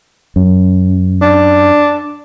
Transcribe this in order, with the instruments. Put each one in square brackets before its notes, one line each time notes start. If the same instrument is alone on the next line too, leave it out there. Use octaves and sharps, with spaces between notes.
[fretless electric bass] F#2
[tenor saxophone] D4